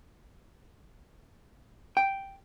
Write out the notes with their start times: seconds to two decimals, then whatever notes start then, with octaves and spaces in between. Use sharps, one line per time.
1.97 G5